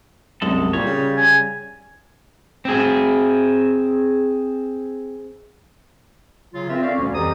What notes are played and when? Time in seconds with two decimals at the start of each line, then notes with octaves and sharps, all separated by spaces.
0.42 C2 F#2 G#3 A4
0.73 A#2 G3 C#5
0.86 C#3
1.17 C#3 G#5
2.65 C4 G#4
6.54 C#3 F#3 F4
6.69 C4 F4 A#4 B4 E5
6.82 C4 C#4 A4 D5 F5
6.97 D2 A#2 D3 F3 G3 C#4
7.13 F2 E3 G4 A4 A#5 D#6